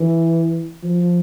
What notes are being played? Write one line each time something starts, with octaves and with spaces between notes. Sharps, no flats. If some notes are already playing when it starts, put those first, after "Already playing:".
Already playing: E3
F3